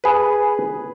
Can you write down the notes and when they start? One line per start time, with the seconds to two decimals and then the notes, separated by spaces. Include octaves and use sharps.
0.04 G#4 B4